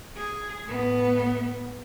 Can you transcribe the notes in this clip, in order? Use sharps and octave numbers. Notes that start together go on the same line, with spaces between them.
G#4
A2 B3